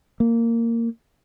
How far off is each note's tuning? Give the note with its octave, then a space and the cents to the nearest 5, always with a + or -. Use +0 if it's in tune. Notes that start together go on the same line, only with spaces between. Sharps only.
A#3 -15